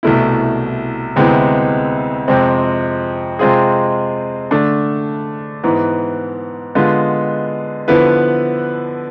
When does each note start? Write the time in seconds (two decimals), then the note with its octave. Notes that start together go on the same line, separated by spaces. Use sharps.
0.03 C2 B2 A3 E4
1.16 D2 C3 G#3 B3 E4
2.28 F2 C3 G#3 C4
3.39 C3 G#3 C4 F4 G#4
4.51 D3 A3 D4
5.63 G#2 E3 B3
6.75 D3 G#3 B3 F4 B4
7.88 D3 F3 B3 E4 B4